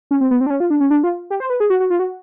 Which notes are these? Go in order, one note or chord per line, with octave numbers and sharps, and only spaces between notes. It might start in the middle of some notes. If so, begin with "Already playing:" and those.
C#4
C4
B3
C4
D4
C#4
F4
D4
C#4
D4
F4
G4
C5
B4
G#4
F#4
F#4
F4
F#4